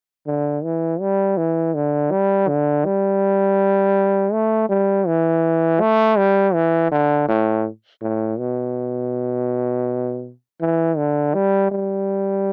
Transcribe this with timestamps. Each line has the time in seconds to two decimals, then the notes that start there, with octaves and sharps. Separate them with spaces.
0.27 D3
0.63 E3
1.00 G3
1.38 E3
1.74 D3
2.11 G3
2.48 D3
2.85 G3
4.33 A3
4.69 G3
5.07 E3
5.81 A3
6.17 G3
6.54 E3
6.92 D3
7.28 A2
8.02 A2
8.39 B2
10.61 E3
10.97 D3
11.34 G3
11.71 G3